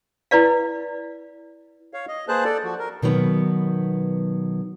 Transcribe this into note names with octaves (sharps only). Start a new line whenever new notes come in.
E4 B4 D5 F5
C#5 F5
D#5
A#3 G#4 B4 C5 A5 F#6
A4 D5
F3 F#4
A#4
B2 D#3 F#3 B3